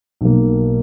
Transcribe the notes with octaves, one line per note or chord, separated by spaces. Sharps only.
B1 B2 F#3 A#3